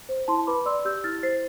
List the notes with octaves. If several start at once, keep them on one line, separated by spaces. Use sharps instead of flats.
C5
E4 A5 C6
B4 B5 D6
D5 C6 E6
G4 E6 G6
E4 F6 A6
C5 A6 C7